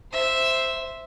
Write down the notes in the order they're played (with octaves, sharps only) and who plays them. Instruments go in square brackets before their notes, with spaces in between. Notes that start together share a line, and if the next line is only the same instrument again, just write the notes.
[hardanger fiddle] C5 E5